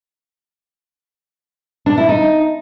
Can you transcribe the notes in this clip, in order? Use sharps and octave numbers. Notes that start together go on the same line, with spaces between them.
D4
E4
D#4